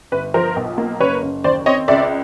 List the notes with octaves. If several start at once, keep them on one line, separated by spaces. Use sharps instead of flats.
G1 B4
F3 A#4 C5
B1
A#3
F#1 B4 C#5
F#1
D#2 C5 D5
C4 C#5 D#5
C#2 D5 E5